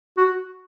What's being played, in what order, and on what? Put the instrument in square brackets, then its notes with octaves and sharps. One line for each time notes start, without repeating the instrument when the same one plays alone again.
[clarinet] F#4